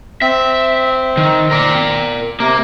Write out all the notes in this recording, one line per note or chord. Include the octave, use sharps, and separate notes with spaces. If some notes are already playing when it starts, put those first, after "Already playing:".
C4 E5
D#3
A#4 D5
C3 A#3